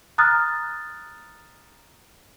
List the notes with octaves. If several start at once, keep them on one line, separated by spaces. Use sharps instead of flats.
A#5 D#6 F6 F#6 A6